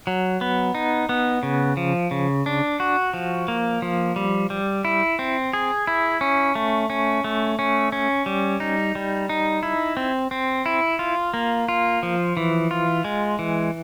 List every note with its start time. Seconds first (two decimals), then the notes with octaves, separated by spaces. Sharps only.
0.07 F#3
0.41 B3
0.75 D#4
1.09 B3
1.43 C#3
1.77 F3
2.11 C#3
2.46 D4
2.80 F#4
3.14 F3
3.48 A#3
3.82 F3
4.16 G3
4.50 G3
4.85 E4
5.19 C4
5.53 G#4
5.87 E4
6.21 C#4
6.55 A3
6.90 C#4
7.24 A3
7.59 C#4
7.92 C#4
8.26 G3
8.60 D#4
8.95 G3
9.29 D#4
9.63 E4
9.97 C4
10.31 C4
10.66 E4
10.99 F4
11.34 A#3
11.68 F4
12.03 F3
12.37 E3
12.71 F4
13.05 G#3
13.39 E3